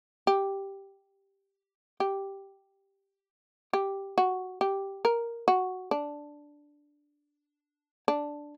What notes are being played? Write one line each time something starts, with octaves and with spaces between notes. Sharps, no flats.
G4
G4
G4
F#4
G4
A#4
F#4
D4
D4